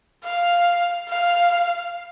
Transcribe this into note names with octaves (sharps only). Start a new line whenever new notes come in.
F5
F5